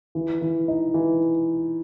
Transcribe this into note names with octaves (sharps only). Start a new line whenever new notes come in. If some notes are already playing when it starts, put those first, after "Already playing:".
E3
E3
D#4
E3